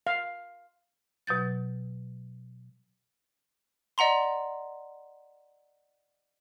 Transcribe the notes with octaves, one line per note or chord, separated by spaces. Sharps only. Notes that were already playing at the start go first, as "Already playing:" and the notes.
F5
B2 F#3 G6 A6
D5 D#5 F#5 A#5 C6